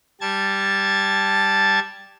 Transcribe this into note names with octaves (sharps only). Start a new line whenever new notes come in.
G3 A5 G#6 A6